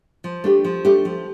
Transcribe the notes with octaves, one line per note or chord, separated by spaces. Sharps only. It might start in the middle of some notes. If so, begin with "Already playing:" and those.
F3
A3 D4 G4
F3
A3 D4 G4
F3